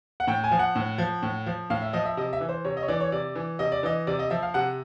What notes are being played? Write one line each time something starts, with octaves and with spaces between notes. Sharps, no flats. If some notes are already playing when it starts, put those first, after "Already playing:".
F#5
A2 G5
G#5
F3
F#5
A2
F3
A2
F3
A2 F5
E5
F3 D#5
E5
C3 D#5
E5
E3
C5
C3 C#5
D#5
C#5
E3 D5
C#5
C3 D5
E3
C3 D#5
D5
E3 D#5
C3 D5
D#5
F3 E5
F5
C3 F#5